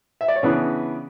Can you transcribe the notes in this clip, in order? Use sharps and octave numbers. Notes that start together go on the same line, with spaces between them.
E5
D5
C#5
C#3 E3 B3 D4 G#4 B4